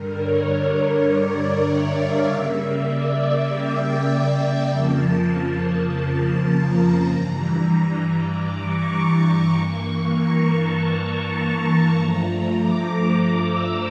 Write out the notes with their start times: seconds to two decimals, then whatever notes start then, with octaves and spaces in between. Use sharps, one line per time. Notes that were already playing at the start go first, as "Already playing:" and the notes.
Already playing: G2 D3 G3 A#4
0.15 C#5
1.05 D5
1.66 E5
1.96 F5
2.26 C#3 G3 A#3 E5
2.86 D5
3.17 E5
3.47 G5
4.68 F2 C#3 F3 A#3 A5
6.50 A#5
7.09 G2 E3 G3
8.30 D6
8.60 C#6
9.52 G2 E3 A#3
10.11 A#5
10.42 A5
10.71 A#5
11.32 A5
11.62 A#5
11.92 G2 F3 A3 A#5
12.53 D6
13.13 D6
13.43 E6